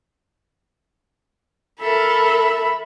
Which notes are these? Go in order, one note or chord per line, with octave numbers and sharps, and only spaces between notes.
A4 A#4 E5 B5